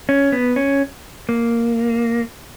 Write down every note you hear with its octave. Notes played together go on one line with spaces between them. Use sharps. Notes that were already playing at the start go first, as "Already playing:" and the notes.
C#4
B3
C#4
A#3